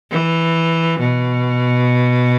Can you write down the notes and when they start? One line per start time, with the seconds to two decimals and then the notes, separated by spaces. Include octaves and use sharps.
0.11 E3
1.00 B2